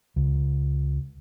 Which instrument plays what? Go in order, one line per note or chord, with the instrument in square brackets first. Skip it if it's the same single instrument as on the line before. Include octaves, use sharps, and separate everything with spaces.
[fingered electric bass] C#2